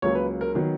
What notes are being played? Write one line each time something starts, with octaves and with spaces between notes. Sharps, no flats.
C#2 C#3 F#3 A#3 C#5
B4
A#4
D#3 F#3 B3